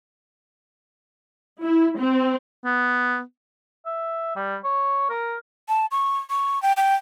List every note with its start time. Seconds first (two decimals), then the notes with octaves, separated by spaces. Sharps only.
1.62 E4
1.97 C4
2.65 B3
3.86 E5
4.36 G3
4.64 C#5
5.10 A#4
5.69 A5
5.91 C#6
6.30 C#6
6.62 G5
6.77 G5